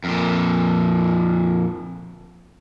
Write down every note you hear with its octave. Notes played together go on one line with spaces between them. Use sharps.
F2 A#2